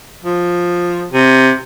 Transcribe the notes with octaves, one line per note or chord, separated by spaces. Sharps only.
F3
C3